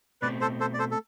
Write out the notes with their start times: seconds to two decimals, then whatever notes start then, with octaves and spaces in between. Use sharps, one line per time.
0.22 B2 A3 C4 B4 D5
0.41 A4 C5
0.60 A4 C5
0.74 D5
0.79 A4 C5
0.91 A4